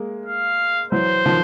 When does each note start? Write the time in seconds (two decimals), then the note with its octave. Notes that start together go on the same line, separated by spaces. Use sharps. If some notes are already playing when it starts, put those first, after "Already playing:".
Already playing: G#3 A#3
0.26 F5
0.92 E3 F#3 C5
1.26 D#3 F3